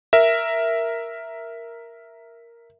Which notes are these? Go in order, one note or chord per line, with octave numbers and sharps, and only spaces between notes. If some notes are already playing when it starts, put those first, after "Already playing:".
A#4 E5